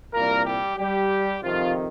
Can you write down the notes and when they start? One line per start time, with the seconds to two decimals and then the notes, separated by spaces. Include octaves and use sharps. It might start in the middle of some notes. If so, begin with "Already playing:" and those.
0.13 C2 A#2 G3 A#3 A#4
0.45 G3 G4
0.78 G3 G4
1.43 F2 C3 D#3 F3 F4